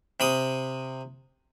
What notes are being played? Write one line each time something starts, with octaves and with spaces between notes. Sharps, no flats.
C3 B5 D#6